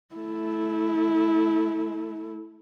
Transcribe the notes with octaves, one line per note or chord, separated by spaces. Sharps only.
A3 E4